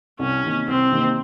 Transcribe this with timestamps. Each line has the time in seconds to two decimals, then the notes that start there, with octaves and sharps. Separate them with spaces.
0.19 C2 C#4
0.44 C3 D#3 A#3
0.67 C2 C4
0.92 C3 D#3 A#3